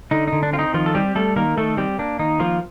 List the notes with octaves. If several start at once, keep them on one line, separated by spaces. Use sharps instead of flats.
D3 D#4
D3 D#4
D4
C4 F4
D#4
D#3 F3 F4
A4
G3 C4 G4
G3 A3 A4
D#3 A#3 A#4
D#3 A3 A4
G3 C4 G4
A#3 D4
D#3 D#4
F3 A#3 F4